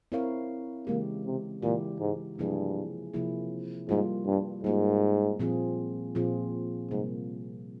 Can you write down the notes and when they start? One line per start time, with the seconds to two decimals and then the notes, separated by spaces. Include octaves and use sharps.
0.12 C4 E4 A#4 C#5 F5
0.87 C#3 E3 G#3 A#3 E4 G4
1.25 C3
1.62 A#2 C#3 E3 G#3 E4 G4
2.00 G#2
2.38 G2 C3 F3 A#3 E4 G#4
3.14 C3 F3 A#3 E4 G#4
3.89 G#2 G3 A#3 F4
4.26 G2
4.64 G#2 G3 A#3 F4
5.39 A#2 F3 C4 F4 G#4
6.15 A#2 F3 C4 F4 G#4
6.90 G#2 C3 G3 A#3